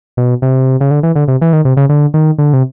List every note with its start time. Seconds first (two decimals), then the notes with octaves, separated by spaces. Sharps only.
0.17 B2
0.42 C3
0.81 C#3
0.91 D3
1.03 E3
1.16 D3
1.28 C3
1.41 E3
1.53 D#3
1.65 C3
1.77 C#3
1.89 D3
2.14 D#3
2.38 D3
2.53 C3